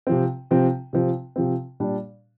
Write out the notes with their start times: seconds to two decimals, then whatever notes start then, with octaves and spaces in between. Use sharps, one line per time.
0.07 C3 F3 C4
0.51 C3 F3 C4
0.93 C3 F3 C4
1.36 C3 F3 C4
1.80 A#2 G3 D4